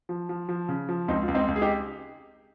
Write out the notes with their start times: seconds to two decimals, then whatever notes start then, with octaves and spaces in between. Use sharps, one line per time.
0.09 F3
0.29 F3
0.49 F3
0.69 C#3
0.89 F3
1.08 C#2 C4 D#4
1.23 F4
1.28 C#2
1.35 C4 D#4
1.48 C#2
1.56 G#4
1.61 D#4 G4